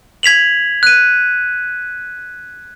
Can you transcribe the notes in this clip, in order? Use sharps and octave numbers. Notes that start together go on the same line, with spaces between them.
G#6 B6 F7 F#7
F#6 D#7